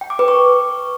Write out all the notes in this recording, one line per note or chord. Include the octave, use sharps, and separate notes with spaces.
G5
D6
B4
C#6